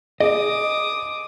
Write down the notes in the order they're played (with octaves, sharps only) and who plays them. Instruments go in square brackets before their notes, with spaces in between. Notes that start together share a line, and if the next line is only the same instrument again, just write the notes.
[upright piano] G#4 [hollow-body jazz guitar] D#5 [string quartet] D6 D#6